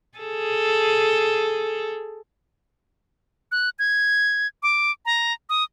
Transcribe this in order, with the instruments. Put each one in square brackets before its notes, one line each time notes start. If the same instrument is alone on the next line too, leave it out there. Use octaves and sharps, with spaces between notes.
[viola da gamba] G#4 A4
[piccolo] F#6
G#6
D6
A#5
D#6